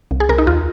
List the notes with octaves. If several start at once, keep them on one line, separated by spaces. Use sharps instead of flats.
C2
G#4
C2 A#4
D#4
D#2 F4